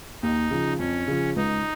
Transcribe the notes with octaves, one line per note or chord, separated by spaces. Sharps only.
D#2 D#4
C#3 F3
F2 C#4
C#3 F3
C#2 D#4